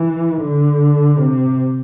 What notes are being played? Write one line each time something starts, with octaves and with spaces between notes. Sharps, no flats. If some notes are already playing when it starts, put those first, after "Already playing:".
Already playing: E3
D3
C3